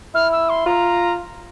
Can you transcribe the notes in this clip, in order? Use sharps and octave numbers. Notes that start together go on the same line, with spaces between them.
E4 F6
E6
C6
F4 A#5